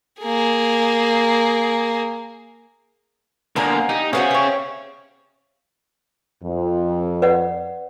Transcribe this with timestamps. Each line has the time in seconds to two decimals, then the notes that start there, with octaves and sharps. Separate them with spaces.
0.22 A#3 G#4
3.56 D3 A#3 B3 F5 G#5 A#5
3.89 D#4 G4
4.13 A3 B3 C#4 F#4 G#4 C5 E5 F5
4.31 G4 C#5
6.44 F2
7.22 B4 D5 F#5